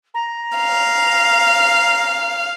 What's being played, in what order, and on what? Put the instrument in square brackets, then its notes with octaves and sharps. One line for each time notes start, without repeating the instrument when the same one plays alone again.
[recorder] A#5
[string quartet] F5